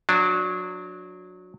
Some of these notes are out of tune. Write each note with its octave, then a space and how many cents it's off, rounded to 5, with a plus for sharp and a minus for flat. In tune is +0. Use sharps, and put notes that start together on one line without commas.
F#3 -25 D4 +0